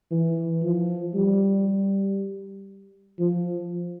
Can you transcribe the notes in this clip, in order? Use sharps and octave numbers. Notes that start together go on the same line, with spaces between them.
E3
F3
G3
F3